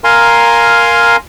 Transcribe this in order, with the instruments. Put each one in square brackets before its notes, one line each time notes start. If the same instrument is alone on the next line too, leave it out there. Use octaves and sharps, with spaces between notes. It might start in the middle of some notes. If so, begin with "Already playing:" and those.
[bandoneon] A#4 F5 G#5 A#5 C6